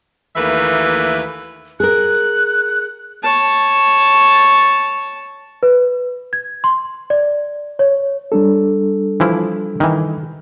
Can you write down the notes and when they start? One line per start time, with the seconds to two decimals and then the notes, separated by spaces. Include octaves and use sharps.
0.36 D#2 E3 A3 A#3 B4 E5
1.80 G#4 A#4 F#6
3.23 C#5 A5
5.63 B4
6.33 G#6
6.64 C6
7.10 D5
7.79 C#5
8.32 G3 D4 A4
9.20 E3 F3 E4
9.80 D#3 E3